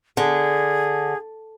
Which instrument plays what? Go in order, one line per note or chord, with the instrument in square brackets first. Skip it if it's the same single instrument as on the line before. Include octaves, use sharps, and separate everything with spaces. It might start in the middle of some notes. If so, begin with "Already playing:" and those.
[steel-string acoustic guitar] D3 [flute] G#4